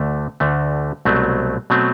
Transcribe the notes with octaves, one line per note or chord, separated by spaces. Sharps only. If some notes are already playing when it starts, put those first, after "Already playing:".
Already playing: D2 D3 A3
D2 D3 A3
C2 B2 F#3 A3 C4
B2 F#3 A3 C4